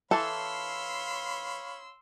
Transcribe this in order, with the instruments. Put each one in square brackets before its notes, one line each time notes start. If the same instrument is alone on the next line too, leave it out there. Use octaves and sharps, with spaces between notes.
[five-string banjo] E3 A4 [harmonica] C#5 F5 B5 [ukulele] A5 [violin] C6 E6